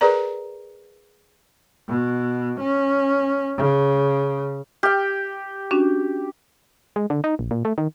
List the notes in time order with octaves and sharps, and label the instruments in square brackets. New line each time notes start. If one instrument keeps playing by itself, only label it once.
[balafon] G#4 A#4 B4 D5 A#5
[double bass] B2
C#4
C#3
[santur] G4 G5 [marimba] F6
[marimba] C#4 D4 F#4
[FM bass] G#3
D3
D#4
A#1
A#2
A3
D#3